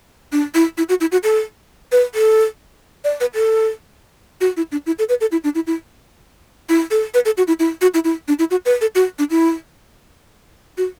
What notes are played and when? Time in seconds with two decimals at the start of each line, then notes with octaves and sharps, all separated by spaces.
0.32 D4
0.54 E4
0.77 E4
0.89 F#4
1.01 E4
1.12 F#4
1.24 A4
1.92 B4
2.15 A4
3.04 D5
3.20 B4
3.35 A4
4.41 F#4
4.57 E4
4.72 D4
4.86 E4
4.99 A4
5.09 B4
5.21 A4
5.32 E4
5.44 D4
5.55 E4
5.67 E4
6.69 E4
6.91 A4
7.14 B4
7.25 A4
7.37 F#4
7.47 E4
7.59 E4
7.81 F#4
7.94 E4
8.04 E4
8.28 D4
8.39 E4
8.51 F#4
8.65 B4
8.81 A4
8.95 F#4
9.19 D4
9.30 E4
10.77 F#4